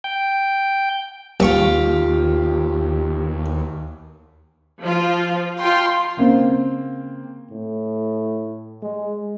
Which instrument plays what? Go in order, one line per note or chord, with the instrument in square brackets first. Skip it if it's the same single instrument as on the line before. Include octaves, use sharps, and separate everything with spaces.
[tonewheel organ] G5
[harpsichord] A#1 C#6 [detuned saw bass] D#2 [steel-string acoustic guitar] F4 G4
[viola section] F3 F4
[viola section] F4 G5 [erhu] C6
[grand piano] C#3 A#3 C4
[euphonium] A2
G#3